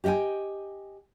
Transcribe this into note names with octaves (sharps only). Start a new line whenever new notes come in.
G4 D#5 E5 G5 G#5